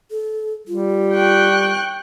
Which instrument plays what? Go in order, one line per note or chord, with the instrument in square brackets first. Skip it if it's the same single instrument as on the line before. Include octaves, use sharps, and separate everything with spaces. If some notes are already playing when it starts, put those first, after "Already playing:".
[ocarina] A4
[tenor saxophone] G3 [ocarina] F4
[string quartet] G5 C#6 F#6